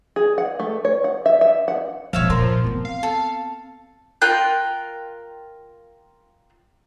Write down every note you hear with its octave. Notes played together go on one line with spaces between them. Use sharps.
G#4
F#5
A3
C#5
F#5
E5
E5
F#5
E1 B2 F3 C#5 E5 F5
A#2 A#4 C6
B3 C4
F5
A4
F4 A#4 G5 F#6